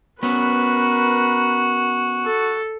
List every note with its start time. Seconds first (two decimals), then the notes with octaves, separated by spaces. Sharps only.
0.23 B3 C#4 F#4 A#4 B4
2.26 A4